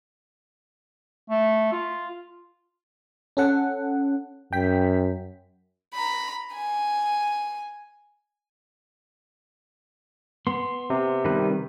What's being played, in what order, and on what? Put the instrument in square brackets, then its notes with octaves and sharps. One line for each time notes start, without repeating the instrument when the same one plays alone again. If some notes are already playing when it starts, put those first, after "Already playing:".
[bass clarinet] A3
F4
[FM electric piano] C#4 A4 F#5
[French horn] F#2 [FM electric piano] G5 B6
[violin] A#5 B5
G#5
[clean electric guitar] B3 [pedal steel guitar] C6
[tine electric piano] C3
[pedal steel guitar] D#3 G3 B4